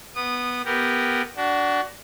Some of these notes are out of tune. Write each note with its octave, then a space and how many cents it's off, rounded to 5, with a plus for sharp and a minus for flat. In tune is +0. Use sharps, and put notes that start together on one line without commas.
B3 +0 D#6 -25
B3 +0 G4 +0 A#4 -10
D4 -10 F#4 +20